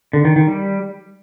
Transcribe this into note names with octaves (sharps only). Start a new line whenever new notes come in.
D3
D#3
D#3
G3